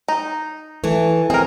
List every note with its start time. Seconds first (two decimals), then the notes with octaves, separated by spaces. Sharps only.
0.08 D#4
0.84 E3 A3
1.30 C4 G#4 A#4